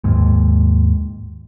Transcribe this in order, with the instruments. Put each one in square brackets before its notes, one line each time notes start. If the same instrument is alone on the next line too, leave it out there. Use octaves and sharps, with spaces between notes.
[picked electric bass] D#2 G#2